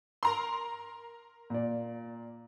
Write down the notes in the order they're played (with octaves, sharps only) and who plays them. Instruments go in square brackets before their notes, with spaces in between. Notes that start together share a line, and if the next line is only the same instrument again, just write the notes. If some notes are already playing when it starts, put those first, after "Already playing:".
[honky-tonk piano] A#4 A#5 C6
[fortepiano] A#2 D5